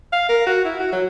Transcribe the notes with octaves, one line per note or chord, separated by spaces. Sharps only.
F5
A#4
F#4
E4
F#4
F#3